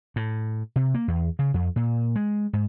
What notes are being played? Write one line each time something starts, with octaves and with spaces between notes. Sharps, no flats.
A2
C3
A#3
E2
C#3
F2
A#2
G#3
G#2